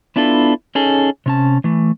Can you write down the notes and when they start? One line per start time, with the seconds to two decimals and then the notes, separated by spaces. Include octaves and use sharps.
0.16 B3 D4 E4 F4 A4
0.75 C#4 D#4 G#4 A4
1.26 C3 C#4 A5
1.64 E3 A3